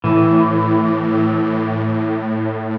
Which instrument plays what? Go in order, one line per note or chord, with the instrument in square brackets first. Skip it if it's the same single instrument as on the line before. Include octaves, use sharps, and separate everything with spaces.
[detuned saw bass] A2 [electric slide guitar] E3